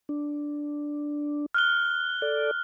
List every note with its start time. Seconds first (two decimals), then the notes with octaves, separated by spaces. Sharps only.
0.09 D4
1.54 F6 F#6 G7
2.22 A4 D5